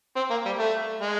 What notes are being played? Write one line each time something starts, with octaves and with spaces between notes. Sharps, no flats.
C4
A#3
G3
A3
G#3